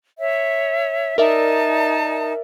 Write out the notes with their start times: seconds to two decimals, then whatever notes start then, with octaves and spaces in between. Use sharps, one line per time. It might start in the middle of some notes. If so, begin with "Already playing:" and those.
0.18 C#5 E5
1.18 D#4 A#4 D5 E5 A5 D#6